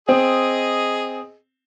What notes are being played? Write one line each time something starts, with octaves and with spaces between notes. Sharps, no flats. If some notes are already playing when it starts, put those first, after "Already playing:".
C4 G#4 D#5